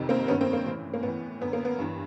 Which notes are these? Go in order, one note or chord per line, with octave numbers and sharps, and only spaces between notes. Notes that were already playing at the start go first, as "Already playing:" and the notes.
Already playing: F2 C3 D#3
A#3 C4
G2 D#3 B3 C#4
A#3 C4
A#3
A2 E3
A#3
A2 B3
E3
F#2 D3 B3
A#3
B3
G2 E3